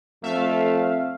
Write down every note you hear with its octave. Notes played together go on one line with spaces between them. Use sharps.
F2 A3 E5 F5